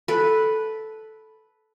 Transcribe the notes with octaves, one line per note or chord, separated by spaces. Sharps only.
A4 B4